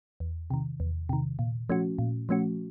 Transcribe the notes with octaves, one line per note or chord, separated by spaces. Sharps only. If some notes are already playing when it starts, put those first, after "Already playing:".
E2
C3 D#3
E2
C3 D#3
A#2
F3 A3 C#4 F#4
A#2
F3 A3 C#4 F#4